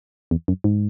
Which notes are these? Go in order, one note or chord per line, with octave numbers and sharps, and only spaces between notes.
E2
F#2
G#2